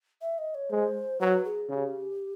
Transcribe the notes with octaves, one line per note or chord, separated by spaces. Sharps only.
E5
D#5
C#5
G#3 C5
F#3 B4
G#4
C#3 G4 G#4